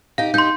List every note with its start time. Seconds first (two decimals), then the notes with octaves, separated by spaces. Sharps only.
0.18 D#4 G4 F5
0.34 D#4 G4 C6 G6